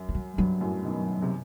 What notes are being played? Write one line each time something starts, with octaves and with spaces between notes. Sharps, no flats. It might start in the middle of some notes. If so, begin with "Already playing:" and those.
Already playing: F#2
E3
F#3
G2 F#3
F#2 A2
B2 D#3
C3